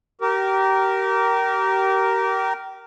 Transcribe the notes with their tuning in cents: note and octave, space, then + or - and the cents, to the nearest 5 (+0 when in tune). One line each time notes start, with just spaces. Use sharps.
G4 -30 A#4 +0